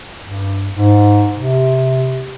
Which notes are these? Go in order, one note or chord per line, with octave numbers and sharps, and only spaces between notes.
G2
G#2
C3